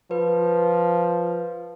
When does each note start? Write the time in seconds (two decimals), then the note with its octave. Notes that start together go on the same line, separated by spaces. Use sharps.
0.11 F3 B4